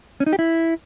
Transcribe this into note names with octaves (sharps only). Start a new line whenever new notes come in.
C#4
D#4
G4
E4